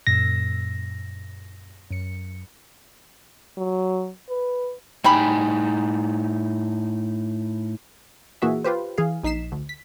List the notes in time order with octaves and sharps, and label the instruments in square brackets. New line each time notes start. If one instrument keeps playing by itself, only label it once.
[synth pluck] F#2 A#2 E6 [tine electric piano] A#6
[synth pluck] F#2 C#7
[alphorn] F#3
B4
[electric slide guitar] A2 D#4 G#5 [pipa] G3 G5 B5
[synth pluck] A#2 E3 A#3 F#4 G#4 E5
F4 G4 B4 C5
E3 G#4 F5
A#1 D#4 B6 C7 E7
D2
B6